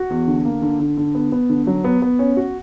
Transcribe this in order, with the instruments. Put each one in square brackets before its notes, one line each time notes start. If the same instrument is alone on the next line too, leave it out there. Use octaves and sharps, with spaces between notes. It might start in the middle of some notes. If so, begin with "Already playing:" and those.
Already playing: [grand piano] F#4
E2
D3
A#3
D3
D3
D3
B3
B3
D3
F#3
B3
B3
C#4
F#4